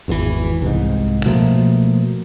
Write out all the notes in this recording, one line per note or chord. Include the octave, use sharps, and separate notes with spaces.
G#1 E2 D3 E3
C2 G#2
B2 F3 A3 A#3